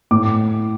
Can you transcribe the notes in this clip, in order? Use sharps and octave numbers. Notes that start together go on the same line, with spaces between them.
A2 D6